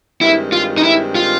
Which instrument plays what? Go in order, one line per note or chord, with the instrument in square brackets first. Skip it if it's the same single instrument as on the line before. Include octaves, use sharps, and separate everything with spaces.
[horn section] G2 D#3 G#3 C4 [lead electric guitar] E4
[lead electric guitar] F4
D#4
E4
F4